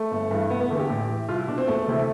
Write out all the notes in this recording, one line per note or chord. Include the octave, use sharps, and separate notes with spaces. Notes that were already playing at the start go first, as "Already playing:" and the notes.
Already playing: A3
G1
G2 E3
F1 B3
B3
E2 D3 A3
G4
A1
A2 E3
C2 F4
E4
B2 D4
C4
E1 A3
D2 C3 E3